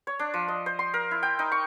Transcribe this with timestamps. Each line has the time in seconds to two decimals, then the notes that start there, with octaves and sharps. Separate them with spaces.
0.07 C#5
0.19 D4
0.34 F3
0.48 D#5
0.66 C5
0.79 C6
0.94 A#4
1.11 E4
1.23 G5
1.39 D#4
1.52 C#6